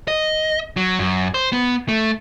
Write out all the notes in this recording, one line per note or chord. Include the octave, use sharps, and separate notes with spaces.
D#5
F#3
F#2
C5
B3
A3